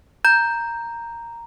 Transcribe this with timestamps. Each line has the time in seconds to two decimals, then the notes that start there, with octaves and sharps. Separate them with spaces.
0.25 A#5 G6